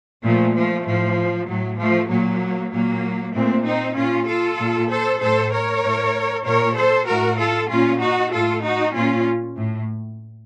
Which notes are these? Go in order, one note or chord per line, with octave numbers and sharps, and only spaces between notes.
A#2 F3 A3
F3 A3
A2 F3
A2 F#3
F3 A3
A#2 F#3 A#3
A#2 F#3 A#3
A#2 A3 C4
C4 D#4
A#2 C#4 F4
F4 A4
A#2
A4 C5
A2 A4 C5
A#4 C#5
A2
A#2 A#4 C#5
A4 C5
A2 F#4 A#4
F4 A4
A#2 C#4 F4
D#4 F#4
A2 F4 A4
D#4 F#4
A#2 C#4 F4
A2